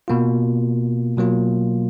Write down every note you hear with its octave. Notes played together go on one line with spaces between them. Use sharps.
B2 A#3 F4
B2 F#3 A#3 F4